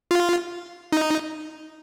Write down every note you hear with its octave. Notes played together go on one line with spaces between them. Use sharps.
F4
D#4